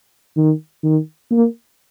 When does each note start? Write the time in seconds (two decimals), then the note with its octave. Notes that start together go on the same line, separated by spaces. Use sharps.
0.37 D#3
0.83 D#3
1.31 A#3